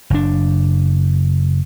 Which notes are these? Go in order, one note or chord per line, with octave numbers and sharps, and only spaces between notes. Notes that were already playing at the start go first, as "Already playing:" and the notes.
F#1 D4